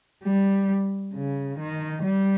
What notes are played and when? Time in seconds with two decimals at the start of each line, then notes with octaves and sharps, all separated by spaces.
0.24 G3
1.14 C#3
1.59 D#3
2.03 G3